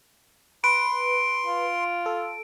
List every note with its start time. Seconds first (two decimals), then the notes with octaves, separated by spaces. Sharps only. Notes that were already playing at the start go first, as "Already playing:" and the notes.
0.64 B4 C6 D7
1.47 F4
2.06 A4